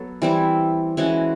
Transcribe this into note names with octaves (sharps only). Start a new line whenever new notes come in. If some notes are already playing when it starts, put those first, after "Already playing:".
Already playing: F#3 B3 A4
E3 G3 C4 E4
E3 G#3 C#4 F#4